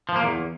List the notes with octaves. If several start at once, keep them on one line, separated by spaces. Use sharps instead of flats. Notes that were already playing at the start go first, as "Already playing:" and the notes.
F3
A#3
E2